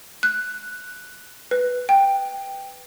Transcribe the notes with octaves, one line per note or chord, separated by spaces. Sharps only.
F#6
B4
G5